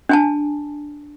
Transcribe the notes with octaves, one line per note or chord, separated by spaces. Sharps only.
D4 G#5 A5